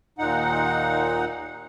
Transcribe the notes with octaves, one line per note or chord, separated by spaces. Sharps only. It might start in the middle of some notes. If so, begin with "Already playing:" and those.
D#2 A#2 D#4 F#5